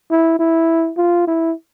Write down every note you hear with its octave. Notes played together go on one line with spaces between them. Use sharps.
E4
E4
F4
E4